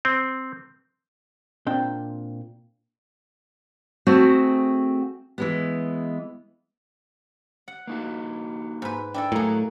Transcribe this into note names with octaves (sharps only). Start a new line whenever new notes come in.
C4
A#2 C4 D4 G5
A3 C4 F#4 G#4
E3 G#3 B3
F#5
A#3 D#4 F#4
G#2 B4
D4 E4 A4 G5
A2 F#3 A#3 G#4 A#5